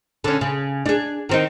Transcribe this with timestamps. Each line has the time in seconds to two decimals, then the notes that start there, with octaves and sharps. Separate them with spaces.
0.24 D3 C#4
0.41 C#3
0.86 D4 G#4
1.29 D#3 C4 D#4